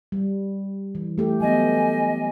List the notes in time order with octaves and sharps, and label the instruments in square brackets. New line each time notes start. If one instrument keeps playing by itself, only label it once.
[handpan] G3
E3
A3 G4 A4
[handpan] F#3 B3 [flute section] D#5 G#5